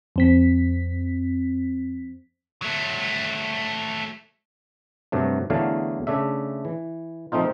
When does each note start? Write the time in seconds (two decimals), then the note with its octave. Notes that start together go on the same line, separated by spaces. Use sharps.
0.16 F2 C4 B6
2.62 F#3 A3
5.12 G2 C3 F#3 A3
5.50 E2 D3 F#3 A3 F5 G#5
6.07 C#3 A3 D4 E5
6.65 E3
7.32 F3 A3 C4 D#4 F4